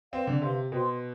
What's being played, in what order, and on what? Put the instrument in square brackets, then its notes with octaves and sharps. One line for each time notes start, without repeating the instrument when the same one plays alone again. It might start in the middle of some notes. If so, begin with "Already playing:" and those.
[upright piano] C4 [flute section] B4 F5 C6
[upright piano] D3
[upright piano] C3 [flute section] B4 F5 C6
[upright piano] B2 [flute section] C5 G5 C6